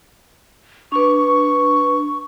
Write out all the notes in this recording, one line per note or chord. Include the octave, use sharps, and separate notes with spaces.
D4 B4 C#6